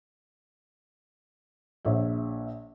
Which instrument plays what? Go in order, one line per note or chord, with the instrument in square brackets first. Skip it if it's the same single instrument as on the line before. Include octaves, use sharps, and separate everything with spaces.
[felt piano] A#1 C#5 E5